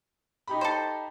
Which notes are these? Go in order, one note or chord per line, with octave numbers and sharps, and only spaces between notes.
D#4 G4 B5
A4 C5